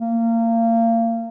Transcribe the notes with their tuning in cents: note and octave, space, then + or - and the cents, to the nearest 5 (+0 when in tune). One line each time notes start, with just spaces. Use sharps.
A#3 -30